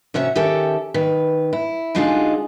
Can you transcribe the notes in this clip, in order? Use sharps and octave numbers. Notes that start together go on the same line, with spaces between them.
C3 C#4 F#4 E5
D#3 C#4 G4 A4 E5
D#3 B4
E4
D3 G#3 D#4 F4 F#4 G#4